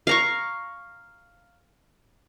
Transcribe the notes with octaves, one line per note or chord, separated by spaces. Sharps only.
F5 A#5 C#6